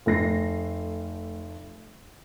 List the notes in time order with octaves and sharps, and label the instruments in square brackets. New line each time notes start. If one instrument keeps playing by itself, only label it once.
[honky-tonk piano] F1 A3 A#6 C7